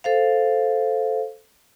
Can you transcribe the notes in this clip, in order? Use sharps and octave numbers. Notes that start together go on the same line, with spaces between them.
A4 C5 F5